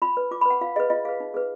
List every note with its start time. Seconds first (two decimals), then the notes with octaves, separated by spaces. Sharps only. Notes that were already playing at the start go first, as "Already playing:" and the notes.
0.02 F4 B5
0.17 B4
0.31 F4 D6
0.41 B5
0.45 B4 F#5
0.61 F4 F5
0.76 G#4 B4 D#5
0.90 F4 D#5
1.05 G#4 B4 F5
1.20 D#4
1.34 G#4 B4